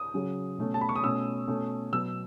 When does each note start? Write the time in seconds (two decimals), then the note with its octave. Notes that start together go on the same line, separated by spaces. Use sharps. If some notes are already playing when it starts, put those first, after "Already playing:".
Already playing: D#6
0.14 C#3 F#3 C#4
0.58 B2 A3 C#4
0.74 A5
0.81 B5
0.89 C#6
0.96 D#6
1.04 B2 A3 C#4 E6
1.48 B2 A3 C#4
1.92 B2 F#3 B3 E6